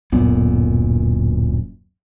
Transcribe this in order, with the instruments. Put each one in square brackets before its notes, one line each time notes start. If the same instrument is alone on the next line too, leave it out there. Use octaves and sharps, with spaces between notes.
[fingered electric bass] D1 F#2 A#2 B3